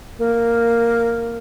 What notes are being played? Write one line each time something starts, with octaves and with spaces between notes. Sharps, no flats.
A#3